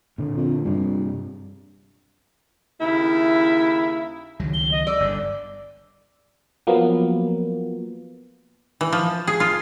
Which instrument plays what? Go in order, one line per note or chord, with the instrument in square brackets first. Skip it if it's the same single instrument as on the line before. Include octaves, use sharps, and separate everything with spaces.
[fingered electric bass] A#2 D3
[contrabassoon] F2
[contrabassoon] A#1 [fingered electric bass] G2 C3 G3
[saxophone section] D#2 C#3 E4
[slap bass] C#2 D#3 F#3
[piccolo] G7
D#5
[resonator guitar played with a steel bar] D5 [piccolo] E6
[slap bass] G1 D3
[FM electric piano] F3 F#3 A#3 B3
[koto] E3
F3
G#4
F4